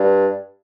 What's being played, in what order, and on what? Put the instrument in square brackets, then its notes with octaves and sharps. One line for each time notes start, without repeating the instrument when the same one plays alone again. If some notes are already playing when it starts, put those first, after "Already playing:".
Already playing: [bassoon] G2